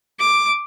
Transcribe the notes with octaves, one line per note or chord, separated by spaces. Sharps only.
D6